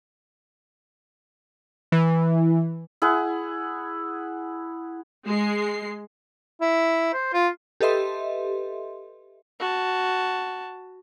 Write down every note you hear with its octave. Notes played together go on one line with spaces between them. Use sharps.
E3
E4 G#4 F#5
G#3 C7
E4
C5
F4
G4 A4 B4 D#5 E5 C6
F#4 A5